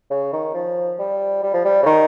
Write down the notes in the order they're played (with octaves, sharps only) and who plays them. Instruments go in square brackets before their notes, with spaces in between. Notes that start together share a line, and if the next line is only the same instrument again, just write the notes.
[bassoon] C#3
D#3
F3
G3
G3
F3
G3
C#3
D#3